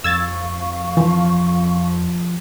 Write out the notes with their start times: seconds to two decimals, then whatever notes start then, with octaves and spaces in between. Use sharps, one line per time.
0.04 F2 F5 C#6 E6 G#6 A6
0.97 E3 F3